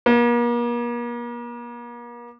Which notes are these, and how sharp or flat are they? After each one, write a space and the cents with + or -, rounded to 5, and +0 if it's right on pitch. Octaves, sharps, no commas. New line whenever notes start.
A#3 +40